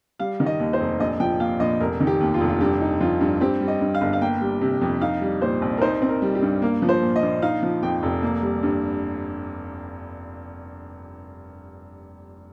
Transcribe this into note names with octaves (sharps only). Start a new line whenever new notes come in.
G3 F5
D#3
D#5
D#2
C5
F1
A#1 D#5
F3 G5
A#2 F5
A#1 D#5
F1 A#4
D#3
G4
D#2
F4
F1
F4
G2 G4
D#4
F3 F4
G2
C4 G4
G3
D#5
G2
F5
G1
F5
A#3 G5
G3
C3
F2
D#4 F5
G3
A#2 C5
C2
A#4
D#4 C5
C4
A#4
G3
G4
G2
A#3 A#4
F3
C5
A#2
D#5
A#1
D#4 F5
F3
F2 G5
F1
A#3
G3
G2